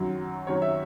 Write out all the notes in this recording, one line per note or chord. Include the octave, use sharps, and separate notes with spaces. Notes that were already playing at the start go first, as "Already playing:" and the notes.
Already playing: F#2 D#3 F#3
F#2 D#3 F#3 C#5
E5